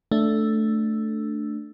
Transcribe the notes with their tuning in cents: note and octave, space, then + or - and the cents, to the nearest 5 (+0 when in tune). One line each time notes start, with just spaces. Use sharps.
A3 +0 D4 +0